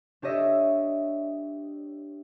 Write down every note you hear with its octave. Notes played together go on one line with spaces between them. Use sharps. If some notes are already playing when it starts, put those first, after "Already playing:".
D4 G4 C#5 D#5 E5